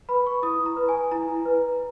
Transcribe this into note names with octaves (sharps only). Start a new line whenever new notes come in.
B4 B5
C#6
E4 D#6
A#5
B4
G#5
E4 A#5
B4